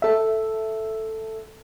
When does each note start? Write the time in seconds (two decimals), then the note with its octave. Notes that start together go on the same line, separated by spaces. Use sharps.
0.02 A4 E5